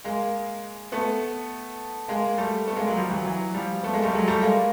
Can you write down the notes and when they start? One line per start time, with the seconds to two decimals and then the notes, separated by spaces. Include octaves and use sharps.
0.04 G#3 A#3
0.92 A3 B3
2.08 G#3 A#3
2.37 G3 A3
2.67 A3 B3
2.76 G#3 A#3
2.87 F#3 G#3
2.96 F3 G3
3.10 E3 F#3
3.25 E3 F#3
3.54 F3 G3
3.83 A3 B3
3.93 G#3 A#3
4.02 G3 A3
4.12 F#3 G#3
4.27 G3 A3
4.42 G#3 A#3